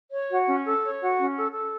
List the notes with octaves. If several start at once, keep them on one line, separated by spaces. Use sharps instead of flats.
C#5
F#4
C#4
A4
C#5
F#4
C#4
A4
A4